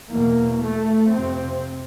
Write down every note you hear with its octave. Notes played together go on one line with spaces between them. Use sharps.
E2 B2 A#3
A3
F2 C3 C4